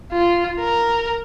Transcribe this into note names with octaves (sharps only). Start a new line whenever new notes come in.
F4
A#4